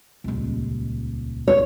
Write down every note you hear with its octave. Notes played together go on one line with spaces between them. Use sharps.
D#1 C#2
C#5